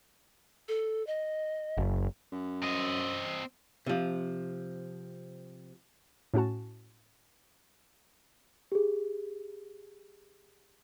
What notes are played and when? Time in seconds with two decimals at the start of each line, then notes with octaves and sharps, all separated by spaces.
0.68 A4
1.07 D#5
1.77 F#1
2.32 F#2
2.63 C4 D#5
3.86 C3 F3
6.34 A2 C#4 F#4 A5
8.72 G4 G#4